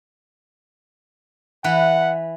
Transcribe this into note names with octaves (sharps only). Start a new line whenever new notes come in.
E3 B4 F#5